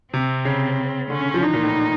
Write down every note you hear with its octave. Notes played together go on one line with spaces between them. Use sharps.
C3 C4
C#3
D3 C#4
F3
E3 D#4
A#2
A2